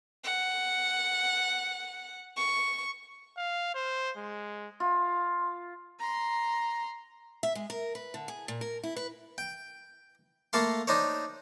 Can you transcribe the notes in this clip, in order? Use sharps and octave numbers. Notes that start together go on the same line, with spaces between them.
F#5
C#6
F5
C5
G#3
F4
A#5 C6
E5
G#3
A#4
B4
D3
G#4
A#2
A#4
E4
B4
G5
A3 A#3 A4 F5 C6
D4 D#4 C5 C#5